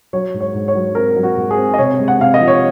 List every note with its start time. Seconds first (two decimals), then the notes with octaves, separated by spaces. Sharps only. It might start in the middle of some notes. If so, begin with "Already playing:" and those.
0.13 F#3 C#5
0.34 G#2
0.41 C#5
0.54 G#2
0.68 C#5
0.75 F#3
0.95 C4 A#4
1.16 F#3
1.23 F#4
1.37 G#2
1.51 G#4
1.57 C4
1.74 D#5
1.78 C3 C#5
1.99 G#3
2.08 F#5
2.19 C3 F5
2.34 D#5
2.40 F3
2.48 C#5